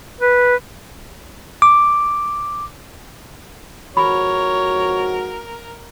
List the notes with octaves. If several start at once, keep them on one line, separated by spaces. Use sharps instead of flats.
B4
D6
F2 G#2 F#4 A#4 C#5 B5